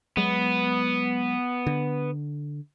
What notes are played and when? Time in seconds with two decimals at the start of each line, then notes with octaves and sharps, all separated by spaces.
0.17 F#3 G#3 B3
1.67 D3